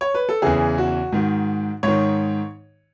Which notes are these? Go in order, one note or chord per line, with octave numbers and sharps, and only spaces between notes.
C#5
B4
A4
E2 C#3 E3 G#4
F#4
G#2 D#3
G#2 D#3 C#5